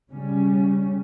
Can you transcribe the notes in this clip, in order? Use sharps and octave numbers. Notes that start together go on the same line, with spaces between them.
C#3 G3 C#4